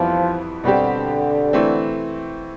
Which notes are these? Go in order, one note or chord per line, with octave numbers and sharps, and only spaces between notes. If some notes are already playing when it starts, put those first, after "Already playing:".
Already playing: F2 E3 F3 G3 B3 E4
B2 D3 G3 C4 G4
E3 A3 C4